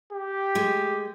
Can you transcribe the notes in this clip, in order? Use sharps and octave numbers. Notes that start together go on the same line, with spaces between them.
G4
G#3 A3